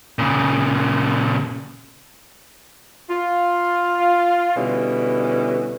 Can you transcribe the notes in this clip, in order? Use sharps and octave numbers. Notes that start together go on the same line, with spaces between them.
A#2 C#3
F4
B2 D3 G3 C#4 E4